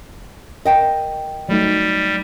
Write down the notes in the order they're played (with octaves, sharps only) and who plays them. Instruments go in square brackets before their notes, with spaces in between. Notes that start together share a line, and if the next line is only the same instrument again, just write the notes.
[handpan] A#4 [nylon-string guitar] D#5 G5 A5
[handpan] F#3 A3 D#4 [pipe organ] G3